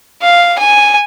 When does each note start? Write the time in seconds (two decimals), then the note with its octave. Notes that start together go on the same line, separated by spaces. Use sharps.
0.22 F5
0.58 G#5